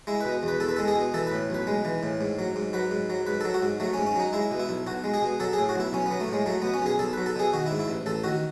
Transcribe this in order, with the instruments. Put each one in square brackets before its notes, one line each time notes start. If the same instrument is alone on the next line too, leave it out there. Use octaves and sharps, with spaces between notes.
[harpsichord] G#3 E4
B2 B4
E2
B4
E2 A4
B4
G#3 A4
G#4
B2
E3 A4
A2 B4
B1 B4
G#3
E3
A2
G#2
F#3
G#2
F#3 B4
G#2
F#3
G#2 B4
F#3 A4
F#4
G#2
F#3 A3
C#4
G#2
C#4
F#3 D#4
G#3 E4
B2
E4
B1
B1 F#4
G#3
G#4
B2
F#3 A4
G#4
A2
F#4
B1 E4
B1 C#4
B3
F#3
A3
A2 G#3
F#3 A3
B2 B3
C#4
B1 G#4
B1 A4
F#3 B4
A4
B2 G#4
D#3 F#4
E4
G#2
E4
A1
A1 A4
D#3 F#4